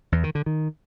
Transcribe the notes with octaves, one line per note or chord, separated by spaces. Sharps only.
E2
D#3
D3
D#3